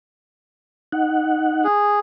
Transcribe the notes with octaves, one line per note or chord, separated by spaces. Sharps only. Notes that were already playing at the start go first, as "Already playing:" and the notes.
D#4 F#5
G#4